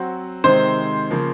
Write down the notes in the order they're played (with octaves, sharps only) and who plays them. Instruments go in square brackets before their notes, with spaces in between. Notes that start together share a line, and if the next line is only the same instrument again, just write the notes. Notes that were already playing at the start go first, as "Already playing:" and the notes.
Already playing: [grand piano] F#3 C4 F#4 C5
[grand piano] C3 D#3 G#3 C4 [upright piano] C5
[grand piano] C#3 F3 A#3